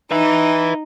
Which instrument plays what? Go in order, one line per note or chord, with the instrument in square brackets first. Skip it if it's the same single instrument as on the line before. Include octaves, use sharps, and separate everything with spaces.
[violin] D#4 [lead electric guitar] B4 E5